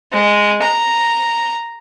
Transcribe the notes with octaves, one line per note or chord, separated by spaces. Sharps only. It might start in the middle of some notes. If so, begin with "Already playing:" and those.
G#3
A#5